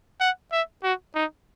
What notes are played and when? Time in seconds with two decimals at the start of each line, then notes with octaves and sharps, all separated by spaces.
0.20 F#5
0.52 E5
0.83 F#4
1.15 D#4